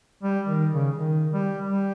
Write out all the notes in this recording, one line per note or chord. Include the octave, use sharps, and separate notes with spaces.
G3
D#3
C#3
D#3
G3
G3